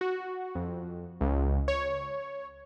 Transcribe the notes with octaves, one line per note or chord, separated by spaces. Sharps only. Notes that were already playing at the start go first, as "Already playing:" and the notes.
F#4
F2
C#2
C#5